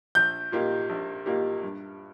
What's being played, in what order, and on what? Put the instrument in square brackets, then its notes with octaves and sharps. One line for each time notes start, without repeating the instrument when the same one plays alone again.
[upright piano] A#1 [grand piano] G6
[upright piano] A#2 A#3 D#4 G4
A#1
A#2 A#3 D#4 G4
G2